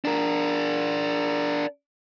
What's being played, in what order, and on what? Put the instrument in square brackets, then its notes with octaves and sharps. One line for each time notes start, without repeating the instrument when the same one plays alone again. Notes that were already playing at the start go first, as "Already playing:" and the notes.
[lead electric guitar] D4 A#4